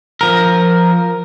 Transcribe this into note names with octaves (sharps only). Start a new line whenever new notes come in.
F3 A#4